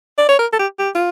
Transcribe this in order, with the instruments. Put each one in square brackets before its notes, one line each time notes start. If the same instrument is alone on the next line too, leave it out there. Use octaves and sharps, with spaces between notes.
[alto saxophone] D5
C#5
A#4
A4
G4
G4
F4